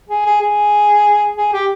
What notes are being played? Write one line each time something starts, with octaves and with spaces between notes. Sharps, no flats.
G#4
G#4
G#4
G#4
G4